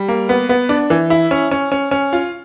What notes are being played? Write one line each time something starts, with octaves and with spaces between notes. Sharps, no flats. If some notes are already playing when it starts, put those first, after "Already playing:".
Already playing: G3
A#3
B3
B3
D4
E3
E4
C#4
C#4
C#4
C#4
F4